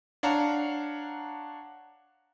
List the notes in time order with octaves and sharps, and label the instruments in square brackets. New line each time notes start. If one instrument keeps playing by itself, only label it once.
[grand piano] D4 C#5 F5 F#5 A5 A#5